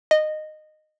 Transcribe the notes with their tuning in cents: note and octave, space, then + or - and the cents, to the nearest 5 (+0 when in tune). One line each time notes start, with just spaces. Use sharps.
D#5 -15